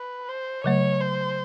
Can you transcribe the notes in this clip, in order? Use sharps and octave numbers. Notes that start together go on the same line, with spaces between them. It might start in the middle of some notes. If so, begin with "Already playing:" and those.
Already playing: B4
C5
C#3 F#3 A3 C#5
C5